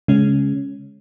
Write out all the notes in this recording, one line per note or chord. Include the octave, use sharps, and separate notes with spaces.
C#3 G#3 C#4